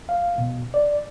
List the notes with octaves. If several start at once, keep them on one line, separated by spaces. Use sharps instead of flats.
F5
B2
D5